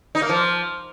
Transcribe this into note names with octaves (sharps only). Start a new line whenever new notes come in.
D#4
A#3
F3